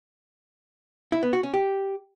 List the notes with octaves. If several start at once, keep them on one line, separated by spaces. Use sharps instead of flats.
E4
B3
F#4
C#4
G4